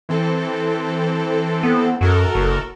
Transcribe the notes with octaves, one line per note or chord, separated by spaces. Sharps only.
E3 C4 A4
B3
F#2 F#4 A4 A#4
F#1